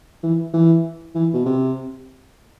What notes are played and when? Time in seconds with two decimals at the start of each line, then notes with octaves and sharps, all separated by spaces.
0.23 E3
0.53 E3
1.15 E3
1.34 B2
1.45 C3